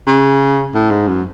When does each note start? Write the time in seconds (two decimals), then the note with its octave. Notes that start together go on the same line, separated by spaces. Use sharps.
0.07 C#3
0.75 A2
0.91 G#2
1.08 F#2